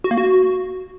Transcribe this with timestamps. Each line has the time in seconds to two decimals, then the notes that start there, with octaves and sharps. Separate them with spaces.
0.04 F#4
0.11 A#3
0.18 F#4